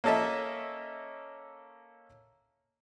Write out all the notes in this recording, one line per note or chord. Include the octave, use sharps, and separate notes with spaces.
A#3 C#4 A4 D#5 E5